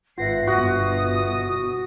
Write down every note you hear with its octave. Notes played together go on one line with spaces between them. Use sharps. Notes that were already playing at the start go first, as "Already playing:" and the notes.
G#1 F4 B4 E5 F#5 A#6 C7
G1 B2 F#4 D#6